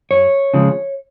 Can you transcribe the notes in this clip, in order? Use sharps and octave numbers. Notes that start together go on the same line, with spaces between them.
F#2 C#5
C#3 F3 G#3